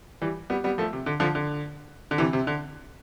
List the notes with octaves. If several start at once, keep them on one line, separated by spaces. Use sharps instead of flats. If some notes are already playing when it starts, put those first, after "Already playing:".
E3 G3
G3 B3
G3 B3
F3 A3
C3
D3
D3 F3
D3
D3
C3 E3
C3
D3